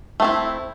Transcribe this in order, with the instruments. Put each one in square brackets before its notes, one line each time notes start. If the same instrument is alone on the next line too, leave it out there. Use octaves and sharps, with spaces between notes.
[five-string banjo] A3 C4 E4